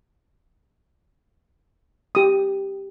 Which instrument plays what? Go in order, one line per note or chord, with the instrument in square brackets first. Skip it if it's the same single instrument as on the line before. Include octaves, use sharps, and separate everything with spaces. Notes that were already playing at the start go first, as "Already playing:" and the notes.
[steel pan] G4 D#6